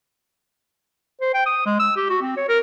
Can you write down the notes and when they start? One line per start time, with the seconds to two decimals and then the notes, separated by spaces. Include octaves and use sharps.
1.21 C5
1.34 G5
1.46 D#6
1.66 G#3
1.80 E6
1.97 G4
2.10 F#4
2.22 C4
2.37 C#5
2.49 A#4